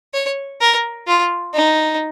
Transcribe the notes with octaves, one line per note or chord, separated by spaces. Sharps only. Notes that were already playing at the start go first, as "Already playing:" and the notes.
C#5
A#4
F4
D#4